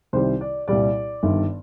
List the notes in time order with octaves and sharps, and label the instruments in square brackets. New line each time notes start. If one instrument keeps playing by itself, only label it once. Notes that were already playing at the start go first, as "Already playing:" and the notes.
[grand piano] C2 C3 D#3 G3 C5
D5
C2 A#2 G3 D5
G1 G2 D#3